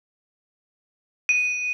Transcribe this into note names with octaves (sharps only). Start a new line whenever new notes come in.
D#7